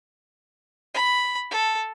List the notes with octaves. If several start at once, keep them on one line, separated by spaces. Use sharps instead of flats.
B5
A4